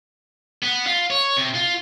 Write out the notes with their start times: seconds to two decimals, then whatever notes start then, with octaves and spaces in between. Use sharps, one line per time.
0.63 B3
0.87 F4
1.11 C#5
1.37 C3
1.54 F4